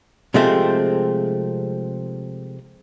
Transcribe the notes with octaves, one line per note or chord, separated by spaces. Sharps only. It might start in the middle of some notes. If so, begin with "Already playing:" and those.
C3 F3 G#3 A3 C4